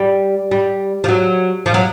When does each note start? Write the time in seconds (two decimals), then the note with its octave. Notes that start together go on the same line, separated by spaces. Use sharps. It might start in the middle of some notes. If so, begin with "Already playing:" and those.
Already playing: G3
0.51 G3
1.04 F3
1.09 F#3
1.66 F3
1.74 F#3